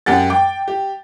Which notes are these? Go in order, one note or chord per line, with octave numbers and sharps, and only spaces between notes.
F#2 G4 F#5 A6
G5 D6
G4